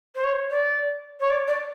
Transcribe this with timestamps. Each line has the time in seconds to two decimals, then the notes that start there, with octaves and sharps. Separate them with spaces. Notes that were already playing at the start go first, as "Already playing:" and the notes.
0.15 C5
0.24 C#5
0.50 D5
1.20 C#5
1.30 D5
1.48 D5